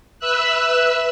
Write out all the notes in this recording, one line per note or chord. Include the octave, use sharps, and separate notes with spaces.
B4 E5 E6 F#6